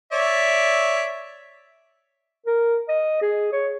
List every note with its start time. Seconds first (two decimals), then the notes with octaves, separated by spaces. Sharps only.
0.12 C#5 D5 E5
2.46 A#4
2.89 D#5
3.21 G#4
3.52 C#5